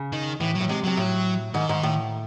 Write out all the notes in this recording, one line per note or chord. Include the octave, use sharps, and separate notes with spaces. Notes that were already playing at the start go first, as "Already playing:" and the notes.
Already playing: C#3
D#3
A2 E3
F#3
A2
C3 G#3
C3 F#3
A2
G#2 D#3
G#2
A2